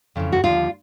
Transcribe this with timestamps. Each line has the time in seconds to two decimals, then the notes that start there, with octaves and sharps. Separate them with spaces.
0.16 F2 C#3 E3
0.32 F#4
0.43 D#2 D3 F3 F4